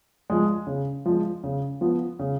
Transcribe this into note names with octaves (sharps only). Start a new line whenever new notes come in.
F3 G#3
C#3
F3 G#3
C#3
F3 B3
C#3